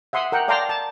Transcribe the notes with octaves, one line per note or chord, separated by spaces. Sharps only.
E5 F#5 C6 D#6
A#4 F#5 G5
D5 F5 G5 A5 A#5 C6
A5